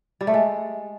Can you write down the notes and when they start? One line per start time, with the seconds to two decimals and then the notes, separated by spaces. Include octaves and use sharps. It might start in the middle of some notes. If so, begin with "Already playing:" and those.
0.21 G3
0.27 A3
0.34 G#3